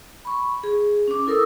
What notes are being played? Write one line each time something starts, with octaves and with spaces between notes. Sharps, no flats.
B5 C#6
G#4
C#4 D6
E4 A4 A#4 D#6 E6